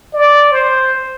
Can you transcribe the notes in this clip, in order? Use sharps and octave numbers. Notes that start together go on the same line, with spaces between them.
D5
C5